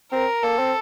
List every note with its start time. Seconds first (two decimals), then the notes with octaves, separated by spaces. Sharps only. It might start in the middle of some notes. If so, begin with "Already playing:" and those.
0.12 C4 A#4
0.43 A#3 A4
0.59 C4